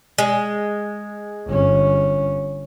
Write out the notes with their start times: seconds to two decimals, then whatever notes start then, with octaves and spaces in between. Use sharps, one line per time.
0.18 G#3
1.47 G1 C#4